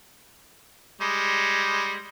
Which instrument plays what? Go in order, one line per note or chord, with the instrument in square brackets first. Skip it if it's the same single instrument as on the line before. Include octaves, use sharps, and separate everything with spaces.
[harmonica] G3 G#3